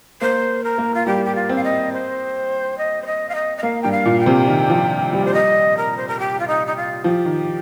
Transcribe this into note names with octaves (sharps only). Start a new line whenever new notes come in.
A#3 C5
A#4
A#3
F4
G3 G4
G4
F4
C4
F5
D#5
C5
D#5
C5
D#5
F5
D#5
D#5
A#3 F5
G2 G5
F5
A#2
G5
C3
D#3
F3
G3
C5
D#5
A#4
C5
A#4
G4
F4
D#4
D#4
F4
F3 G4
D#3